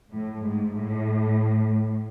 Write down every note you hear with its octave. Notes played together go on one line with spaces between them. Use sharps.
A2
G#2
A2